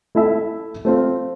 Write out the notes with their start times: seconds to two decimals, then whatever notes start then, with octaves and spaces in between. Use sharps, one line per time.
0.15 A3 E4 A4 E5
0.85 A3 C4 F4